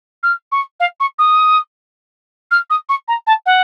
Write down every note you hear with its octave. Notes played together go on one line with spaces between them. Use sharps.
F6
C#6
F5
C#6
D#6
F6
D#6
C#6
A#5
A5
F#5